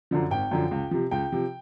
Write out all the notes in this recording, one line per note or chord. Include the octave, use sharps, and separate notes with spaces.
F#2 D3 F3
G#1 G5
F#2 D3 F3
C#2
C3 F3
C#2 G5
C3 F3